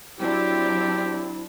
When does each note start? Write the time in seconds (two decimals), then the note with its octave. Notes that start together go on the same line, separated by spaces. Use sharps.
0.19 F#3 C4 D4 E4 G4